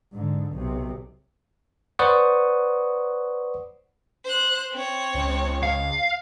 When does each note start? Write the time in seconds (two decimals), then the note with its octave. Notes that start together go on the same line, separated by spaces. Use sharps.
0.13 G#2 D3
0.53 B1 C3
1.99 B4 C5 D5 F#5 C#6 D#6
4.24 C5 F#6
4.72 C4 C#5
5.14 C#2
5.63 F5